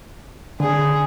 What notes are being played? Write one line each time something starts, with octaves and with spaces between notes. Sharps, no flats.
D3 G#4